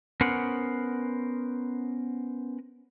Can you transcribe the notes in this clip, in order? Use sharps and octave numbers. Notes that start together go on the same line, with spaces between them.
B3 C#4 A#4 C5 F#5